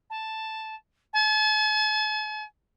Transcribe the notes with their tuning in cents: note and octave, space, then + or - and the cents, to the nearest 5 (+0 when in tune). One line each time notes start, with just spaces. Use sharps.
A5 +0
A5 -45